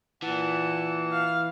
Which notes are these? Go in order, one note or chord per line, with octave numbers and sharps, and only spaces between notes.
A#2 E3 F#5 A5
F5